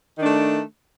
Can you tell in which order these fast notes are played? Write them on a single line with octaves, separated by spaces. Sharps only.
D#3 D4 A3